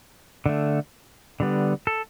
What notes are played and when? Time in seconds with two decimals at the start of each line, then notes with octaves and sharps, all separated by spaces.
0.46 D3 A3
1.40 D3 G3 B3
1.87 A4